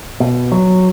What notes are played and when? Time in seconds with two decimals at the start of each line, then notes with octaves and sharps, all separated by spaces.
0.20 B2
0.52 F#3